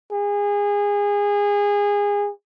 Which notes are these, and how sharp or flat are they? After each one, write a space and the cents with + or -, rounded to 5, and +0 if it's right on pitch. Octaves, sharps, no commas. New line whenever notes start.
G#4 -25